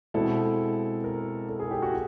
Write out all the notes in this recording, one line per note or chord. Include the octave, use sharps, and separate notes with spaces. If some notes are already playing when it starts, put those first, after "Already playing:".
B2 G#3 C4 E4 A4
A#4
A4
G#4
G4
F#4